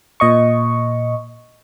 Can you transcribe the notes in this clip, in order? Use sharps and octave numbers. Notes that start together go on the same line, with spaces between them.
A#2 D#5 C#6